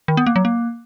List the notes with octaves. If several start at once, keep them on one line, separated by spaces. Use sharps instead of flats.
D#3
B3
A#3
F#3
A#3